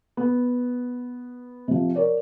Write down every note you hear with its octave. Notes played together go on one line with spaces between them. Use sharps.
B3
C3 F3
A#4 C#5 D5